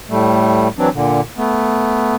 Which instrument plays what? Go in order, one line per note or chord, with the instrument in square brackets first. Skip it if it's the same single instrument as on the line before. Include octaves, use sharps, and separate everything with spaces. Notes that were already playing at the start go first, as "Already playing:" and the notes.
[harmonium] A2 G3 A3
E3 F#3 C4 D4
A#2 D3
A3 B3